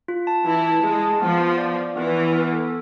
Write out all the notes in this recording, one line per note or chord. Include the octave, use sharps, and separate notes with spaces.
F4
A5
E3 E4 A5
A5
G#3 G#4
A5
F3 B3
B3
D5
D5
E3 B3
B3
B3
A4